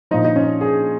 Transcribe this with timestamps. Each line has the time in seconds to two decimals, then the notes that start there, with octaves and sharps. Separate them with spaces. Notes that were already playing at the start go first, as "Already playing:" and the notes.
0.11 A#2 F3 D#4
0.25 D#4
0.36 C#4
0.61 G#4